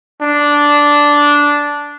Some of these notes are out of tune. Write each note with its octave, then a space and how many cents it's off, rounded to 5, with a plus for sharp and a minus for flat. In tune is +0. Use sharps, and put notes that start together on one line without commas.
D4 -10